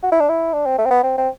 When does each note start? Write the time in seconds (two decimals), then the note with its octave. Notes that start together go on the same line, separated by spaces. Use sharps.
0.03 F#4
0.12 E4
0.20 D4
0.29 E4
0.53 D4
0.66 C4
0.78 A3
0.86 C4
0.91 B3
1.03 C4
1.18 C4